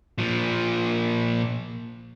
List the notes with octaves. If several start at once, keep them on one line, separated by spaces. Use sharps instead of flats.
A#2 F3